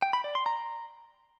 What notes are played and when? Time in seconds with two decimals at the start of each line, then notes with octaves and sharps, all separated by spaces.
0.02 G5
0.13 B5
0.24 D5
0.35 C6
0.46 A#5